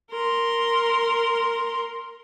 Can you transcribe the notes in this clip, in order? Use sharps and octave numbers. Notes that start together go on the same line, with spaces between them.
A#4 C6